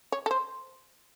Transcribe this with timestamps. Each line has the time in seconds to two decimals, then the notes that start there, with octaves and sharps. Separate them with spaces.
0.12 C#5
0.26 A4
0.31 C5